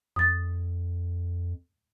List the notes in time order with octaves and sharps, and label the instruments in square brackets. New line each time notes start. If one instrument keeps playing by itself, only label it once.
[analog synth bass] F2 [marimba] D#6 A6